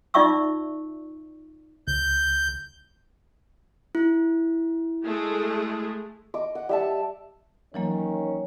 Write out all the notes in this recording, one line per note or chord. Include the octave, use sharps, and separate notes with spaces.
D#4 F4 D5 E5 C#6 E6
C#2 G6
E4
G#3 A3 G#4
D#5 D6
F#5
G3 E5 A5
D#3 E3 F#3 A#3 C#4